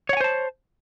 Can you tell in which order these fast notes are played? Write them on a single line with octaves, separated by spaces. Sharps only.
C#5 F#5 G#5 C5 A5